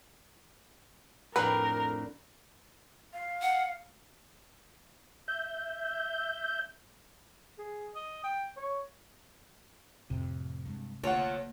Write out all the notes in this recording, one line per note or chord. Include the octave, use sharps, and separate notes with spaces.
F2 A2 D4 A#4 B4
F5
F#5
E5 G6
G#4
D#5
G5
C#5
F2 A2 C3
G2 G#3
F#1 D2 A#3 F4 C#5 F#5